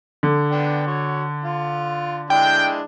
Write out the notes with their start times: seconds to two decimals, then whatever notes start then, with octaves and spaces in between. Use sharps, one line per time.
0.23 D3
0.51 B3 D4 G5
0.87 F#4 C#5
1.44 F4
2.30 G#3 D4 E4 G5